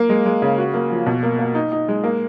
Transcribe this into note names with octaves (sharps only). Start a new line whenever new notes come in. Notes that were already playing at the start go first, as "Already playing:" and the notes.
Already playing: A#3
G#3
G#3
C#3
F#4
A#3
F3
B2
A#3
A#3
D#4
D#4
G#3
A#3